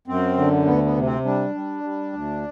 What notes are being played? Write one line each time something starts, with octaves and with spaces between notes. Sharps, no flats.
F#2 C4
D3
D2 B3
B3
C3
C4
G3 D4
G3
G3
D2